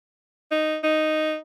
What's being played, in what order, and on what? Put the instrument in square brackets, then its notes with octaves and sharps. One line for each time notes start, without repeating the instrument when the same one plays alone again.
[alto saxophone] D#4
D#4